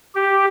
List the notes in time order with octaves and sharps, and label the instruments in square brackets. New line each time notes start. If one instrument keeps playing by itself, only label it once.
[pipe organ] G4